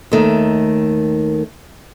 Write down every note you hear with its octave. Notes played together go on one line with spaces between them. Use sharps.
D#2 D#3 A3